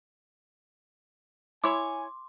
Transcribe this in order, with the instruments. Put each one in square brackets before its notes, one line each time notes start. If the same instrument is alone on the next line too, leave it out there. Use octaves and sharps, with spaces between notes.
[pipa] E4 C#5 [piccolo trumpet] G#5 [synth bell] C6 [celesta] D6